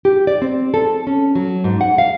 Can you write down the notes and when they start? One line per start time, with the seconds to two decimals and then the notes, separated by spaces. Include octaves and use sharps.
0.05 G4
0.27 D5
0.42 C4
0.74 A4
1.07 C#4
1.35 F#3
1.64 G#2
1.81 F#5
1.98 F5